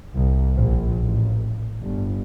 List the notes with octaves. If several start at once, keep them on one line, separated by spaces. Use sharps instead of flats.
C2
A#1
A1
G1